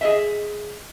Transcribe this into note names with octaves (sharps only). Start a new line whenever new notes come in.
G#4 D#5 E5